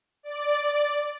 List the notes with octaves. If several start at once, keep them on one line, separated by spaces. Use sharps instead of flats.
D5